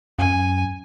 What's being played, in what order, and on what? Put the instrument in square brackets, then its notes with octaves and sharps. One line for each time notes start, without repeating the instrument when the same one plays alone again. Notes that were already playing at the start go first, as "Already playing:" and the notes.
[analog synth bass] F#2 [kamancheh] G#5